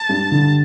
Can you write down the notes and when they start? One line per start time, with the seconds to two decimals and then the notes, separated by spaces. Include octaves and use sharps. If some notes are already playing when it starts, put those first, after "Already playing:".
Already playing: A5
0.09 G2
0.31 D3